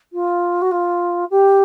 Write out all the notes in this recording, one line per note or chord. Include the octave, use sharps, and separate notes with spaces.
F4
F#4
F4
G4